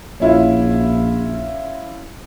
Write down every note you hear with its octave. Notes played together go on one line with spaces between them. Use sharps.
A#1 C#4 E4 F4